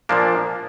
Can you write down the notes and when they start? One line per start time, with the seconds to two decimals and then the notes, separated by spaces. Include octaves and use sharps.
0.09 A#2 F3 A#3 D4